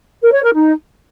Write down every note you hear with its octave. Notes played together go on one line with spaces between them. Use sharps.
A#4
C#5
A#4
D#4